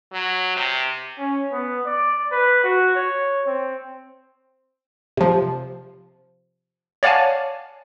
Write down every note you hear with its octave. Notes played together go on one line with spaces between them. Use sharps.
F#3
C3
C#4
B3
D5
B4
F#4
C#5
C4
C3 F3
C#5 D5 F5 F#5 G#5 A5